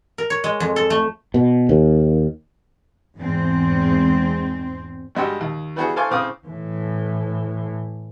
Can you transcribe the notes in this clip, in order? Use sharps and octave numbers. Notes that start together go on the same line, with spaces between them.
A#4
C#5
G#3
F2
A4
A3
B2
D#2
E2 G#2 C4
G2 G3 G#3 F#4 G4 E6
D#2
E3 G3 B3 E4 F#4 G#4
A4 C5 F5 G#5 C#6 D6
A2 C#3 C4 F5 D6 D#6
A2 E3